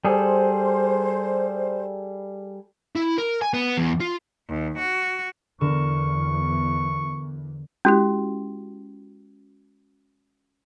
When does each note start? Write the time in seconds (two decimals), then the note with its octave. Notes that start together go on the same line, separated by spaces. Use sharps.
0.05 G3 G#4 A4 C5
2.96 E4
3.18 A#4
3.42 G#5
3.54 B3
3.78 E2
4.00 F4
4.49 D#2
4.78 F#4
5.61 E2 D3 A#4 C#6 E7
7.85 G#3 C#4 E4 F#4 G4